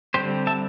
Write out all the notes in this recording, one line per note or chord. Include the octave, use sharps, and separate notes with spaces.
D3 G3 C4 G4 C5
E5 A5